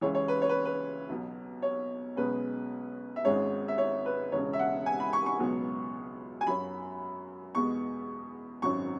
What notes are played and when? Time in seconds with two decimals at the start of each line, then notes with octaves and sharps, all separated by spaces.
0.01 C#2 C#3 E3 C#5
0.15 C#5
0.28 B4
0.42 C#5
0.49 B4
0.65 B4
1.09 B1 B2 F#3
1.62 C#5
2.16 B1 B2 G#3 C#4 B4
3.16 E5
3.25 G#1 G#2 G#3 C#4 C#5
3.68 E5
3.78 C#5
4.06 B4
4.32 E1 E2 C#3 C#5
4.53 E5
4.59 F#5
4.86 G#5
5.00 B5
5.13 C#6
5.26 C#6
5.39 C#2 B2 F#3 B3
6.41 G#5
6.47 F#2 F#3 C#4 B5
7.55 E2 B2 G#3 B3 C#6
8.62 G#1 F#2 F#3 C#4 C#6